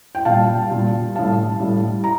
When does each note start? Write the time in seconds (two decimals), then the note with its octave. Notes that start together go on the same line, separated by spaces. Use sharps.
0.15 G5
0.25 A#2 G3 F5 A5
0.70 A#2 G3
1.15 A2 G3 F5 A5
1.60 A2 G3
2.04 A#5